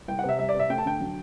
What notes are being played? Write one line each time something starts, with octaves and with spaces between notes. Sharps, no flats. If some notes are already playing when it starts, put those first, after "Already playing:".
C2 G5
C3 F#5
E5
G3 E5
D5
C3
E5
A3 G5
A5
D3 G5
F#3